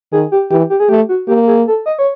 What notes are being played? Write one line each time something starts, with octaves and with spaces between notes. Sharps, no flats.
D#3 G#4
G4
E3 G4
G4
G#4
A3 G4
F#4
A#3 G4
G#4
A4
D#5
C#5